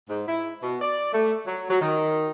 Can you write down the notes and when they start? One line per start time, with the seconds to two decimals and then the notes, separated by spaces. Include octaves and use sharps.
0.09 G#2
0.27 E4
0.62 B2
0.82 D5
1.13 A3
1.46 F#3
1.69 F#3
1.80 D#3